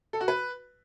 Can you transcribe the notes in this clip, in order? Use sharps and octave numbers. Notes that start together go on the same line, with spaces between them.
A4
F#4
B4